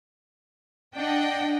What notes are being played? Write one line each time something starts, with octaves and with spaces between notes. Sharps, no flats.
D4 D#5 F#5 G5